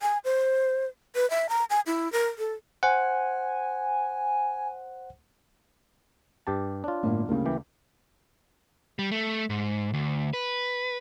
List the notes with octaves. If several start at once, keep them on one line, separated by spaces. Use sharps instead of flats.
G#5
C5
B4
E5
A#5
G#5
E4
A#4
A4
C5 F#5 G#5
G2 G4 A5
D4 F4 C#5
G1 A2 A#3
D2 C#3 G3 A#3
E3 G4
G3
A3
G#2
D2
B4